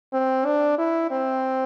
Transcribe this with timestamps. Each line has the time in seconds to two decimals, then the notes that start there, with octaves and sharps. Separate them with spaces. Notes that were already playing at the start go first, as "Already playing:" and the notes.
0.13 C4
0.45 D4
0.78 E4
1.11 C4